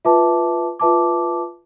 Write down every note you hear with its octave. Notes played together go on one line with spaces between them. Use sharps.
F4 B4 E5 A5 D6
F4 B4 E5 A5 D6